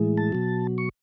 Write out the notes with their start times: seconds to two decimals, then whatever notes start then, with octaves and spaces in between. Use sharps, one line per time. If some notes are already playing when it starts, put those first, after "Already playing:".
Already playing: A2 E3 G#3
0.18 A5
0.32 B2 F#3
0.78 C#6